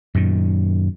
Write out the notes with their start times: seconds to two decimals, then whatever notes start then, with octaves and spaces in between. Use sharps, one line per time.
0.15 F#2 A#2 D#3